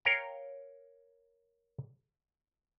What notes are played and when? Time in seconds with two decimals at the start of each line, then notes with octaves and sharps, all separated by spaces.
0.05 A#4 C#5 F5 G5 A#5